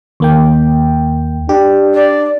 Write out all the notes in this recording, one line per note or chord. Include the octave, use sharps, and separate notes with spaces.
D#2 A#3 G5
D4 G4
D5